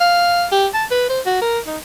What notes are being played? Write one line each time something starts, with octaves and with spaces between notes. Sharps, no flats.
F5
G4
A5
B4
C5
F#4
A#4
D#4